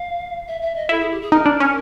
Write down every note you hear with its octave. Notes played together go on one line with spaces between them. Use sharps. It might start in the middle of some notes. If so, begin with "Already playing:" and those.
Already playing: F5
E5
E5
D#5
E4 A4
G#4
G4
G#4
D#4 A#4
D4
C#4